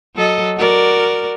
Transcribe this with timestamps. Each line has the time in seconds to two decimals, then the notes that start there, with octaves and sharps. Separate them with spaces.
0.16 F#3 A4 D#5
0.57 F#4 A#4 D5